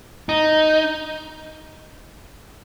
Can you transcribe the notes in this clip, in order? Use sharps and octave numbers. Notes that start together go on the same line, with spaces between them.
D#4